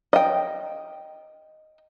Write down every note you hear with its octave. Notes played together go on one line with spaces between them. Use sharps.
D#5 G5